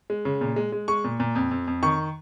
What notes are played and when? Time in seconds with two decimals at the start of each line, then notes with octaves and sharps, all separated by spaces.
0.10 G#3
0.25 C#3
0.41 A#2
0.56 G#3
0.72 G#3
0.88 G#3 C#6
1.04 A#2
1.20 A#2
1.35 F2
1.51 F2
1.67 F2
1.83 D#3 C#6